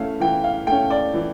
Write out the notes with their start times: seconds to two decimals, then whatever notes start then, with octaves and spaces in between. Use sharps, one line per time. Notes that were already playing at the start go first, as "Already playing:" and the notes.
Already playing: E3 A3 C#4 E5 F5
0.20 E3 G5
0.44 F5
0.67 A3 C#4 G5
0.90 D5
1.14 E3